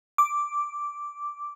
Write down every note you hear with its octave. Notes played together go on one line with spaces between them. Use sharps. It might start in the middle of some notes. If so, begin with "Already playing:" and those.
D6